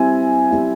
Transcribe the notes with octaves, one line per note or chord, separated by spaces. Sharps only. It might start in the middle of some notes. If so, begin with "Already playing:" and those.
Already playing: G3 C4 E4 G#5
G3 C4 E4